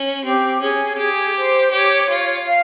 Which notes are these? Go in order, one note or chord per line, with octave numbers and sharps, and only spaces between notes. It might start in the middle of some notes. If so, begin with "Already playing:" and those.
Already playing: C#4
C4 G4
C#4 G#4
G4 G#4
C5
G4 C#5
F4
F5